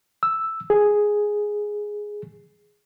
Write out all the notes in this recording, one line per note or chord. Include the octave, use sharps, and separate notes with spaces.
E6
G#4